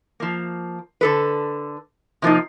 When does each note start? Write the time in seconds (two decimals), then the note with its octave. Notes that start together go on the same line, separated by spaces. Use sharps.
0.20 F3 A#3
1.01 D3 A4 B4
2.22 C3 F3 A#3 D#4